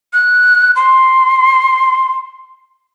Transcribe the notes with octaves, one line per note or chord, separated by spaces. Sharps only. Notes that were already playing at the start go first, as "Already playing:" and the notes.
F#6
C6